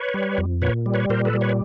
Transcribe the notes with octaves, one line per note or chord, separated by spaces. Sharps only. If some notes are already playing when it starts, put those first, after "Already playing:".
Already playing: B4 C#5
G3
F2
A#2 B4 C#5
G3
B4 C#5
A#2 A#4 C5
A4 B4
G3
B4 C#5